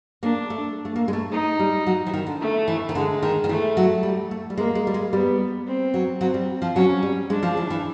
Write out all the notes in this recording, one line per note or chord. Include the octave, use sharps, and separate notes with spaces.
A#3 D4
A3
A3
A#3
G#3
A3
D#4
G3
F#3
E3
D#3
D3
A3
E3
D#3
D3 G#3
D#3
D#3
E3 A3
F#3
G3
A3
G3
G#3 A#3
G#3
G3
G#3
G3 B3
C4
F#3
F#3 C4
G3
F3
F#3 C#4
G3
G#3 D4
F3
E3
E3